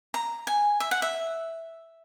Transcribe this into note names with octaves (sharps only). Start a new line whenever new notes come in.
A#5
G#5
E5
F#5
E5